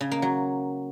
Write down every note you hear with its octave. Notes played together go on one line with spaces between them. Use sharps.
C#3
A#3
F#3